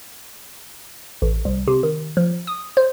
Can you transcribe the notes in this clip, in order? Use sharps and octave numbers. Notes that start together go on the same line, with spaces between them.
A1
C2
C3
D#3
F3
D#6
C5